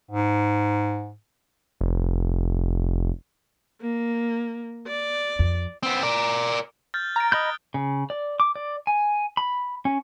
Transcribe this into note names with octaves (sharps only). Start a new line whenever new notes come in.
G#2
F1
A#3
D5
F2
B3 C4
A#4 D5
F6 G6 A6
A#5 F6 A6 D7
D#5 B5 D#6 F#6 G6 G7
C#3
D5
D6
D5
G#5
B5
C#4